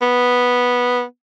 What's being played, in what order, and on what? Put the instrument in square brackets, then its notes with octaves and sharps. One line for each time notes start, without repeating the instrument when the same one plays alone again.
[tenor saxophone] B3